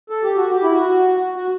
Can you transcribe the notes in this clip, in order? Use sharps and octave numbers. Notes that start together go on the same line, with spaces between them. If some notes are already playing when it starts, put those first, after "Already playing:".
A4
G4
F#4
G4
E4
F#4
F#4